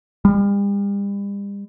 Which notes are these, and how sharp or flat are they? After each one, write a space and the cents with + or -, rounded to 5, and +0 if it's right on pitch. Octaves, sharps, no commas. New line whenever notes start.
G3 +40